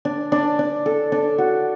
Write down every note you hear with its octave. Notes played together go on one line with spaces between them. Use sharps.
D4
D4
D4
A4
D4
F#4